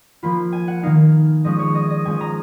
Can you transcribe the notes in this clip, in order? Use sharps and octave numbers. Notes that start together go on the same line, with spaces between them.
F3 A#3 F4 B5
G#5
F#5
D#3 A#3 D#4 F5
F3 G#3 C#4 D#5
C#5
D#5
D#5
F3 G#3 C#4 G#5
A#5